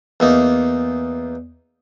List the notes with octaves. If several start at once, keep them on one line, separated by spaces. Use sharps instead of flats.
E2 A#3 D#4